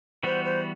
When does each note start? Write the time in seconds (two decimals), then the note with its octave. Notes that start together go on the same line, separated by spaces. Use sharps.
0.23 E3 G3 B3 F#4 C5
0.44 C5